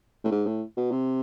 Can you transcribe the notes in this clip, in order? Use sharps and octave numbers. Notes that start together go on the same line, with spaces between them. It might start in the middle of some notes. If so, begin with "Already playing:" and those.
A2
G#2
A2
B2
C3